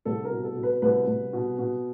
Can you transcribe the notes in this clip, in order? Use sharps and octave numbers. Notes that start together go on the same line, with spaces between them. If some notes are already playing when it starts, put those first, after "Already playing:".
C2 A4
A#4
B2
A4
B2
B4
C2 B4
C2
B2
B2